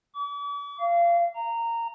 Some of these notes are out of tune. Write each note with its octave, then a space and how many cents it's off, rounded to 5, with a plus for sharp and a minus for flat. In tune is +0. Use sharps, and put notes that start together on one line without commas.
D6 -45
F5 -25
A#5 -15